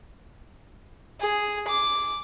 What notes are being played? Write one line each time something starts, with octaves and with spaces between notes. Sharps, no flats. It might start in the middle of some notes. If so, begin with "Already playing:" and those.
G#4
D6